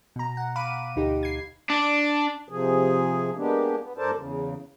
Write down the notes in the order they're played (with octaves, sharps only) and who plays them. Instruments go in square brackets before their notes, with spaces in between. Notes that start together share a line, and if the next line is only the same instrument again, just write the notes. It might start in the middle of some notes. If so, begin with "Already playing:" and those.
[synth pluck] B2 A#5
F#5
F5 B5 D6 D#7
D2 D#4 G4
G#6 C7
[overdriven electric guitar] D4
[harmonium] C3 F3 G#4
G#3 A#3 B3 D4 G4
B3
G2 A4 A#4 C5 D5 A5
E2 C#3